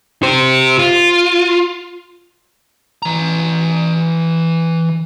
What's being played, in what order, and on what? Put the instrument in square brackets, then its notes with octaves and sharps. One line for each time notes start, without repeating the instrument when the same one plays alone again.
[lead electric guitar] G4 C5
F4
E3 A#5